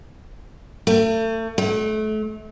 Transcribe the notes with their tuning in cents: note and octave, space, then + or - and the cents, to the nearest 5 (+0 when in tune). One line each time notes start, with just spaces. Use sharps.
A3 +35
A3 -30